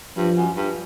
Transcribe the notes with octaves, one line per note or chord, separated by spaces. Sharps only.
G2 F3
F#2
G2